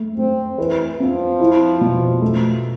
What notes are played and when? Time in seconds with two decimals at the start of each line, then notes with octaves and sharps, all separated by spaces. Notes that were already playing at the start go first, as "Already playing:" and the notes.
Already playing: A3
0.17 A3 C4
0.58 E3 B4
0.99 F3 C4
1.40 E4
1.81 B2
2.21 A3